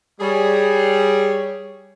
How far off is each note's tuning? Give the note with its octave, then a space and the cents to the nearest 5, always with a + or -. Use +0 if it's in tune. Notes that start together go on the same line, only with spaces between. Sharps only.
G3 +0 G#4 +0 C#5 +0